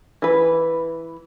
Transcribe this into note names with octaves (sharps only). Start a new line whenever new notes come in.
E3 B4